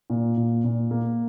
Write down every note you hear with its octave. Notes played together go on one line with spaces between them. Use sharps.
A#2
A#2
A#2
A#3